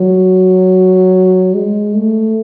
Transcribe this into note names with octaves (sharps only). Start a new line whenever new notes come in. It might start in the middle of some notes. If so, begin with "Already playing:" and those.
Already playing: F#3
G#3
A3